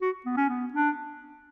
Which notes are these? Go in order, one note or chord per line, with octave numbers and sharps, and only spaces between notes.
F#4
B3
C#4
B3
D4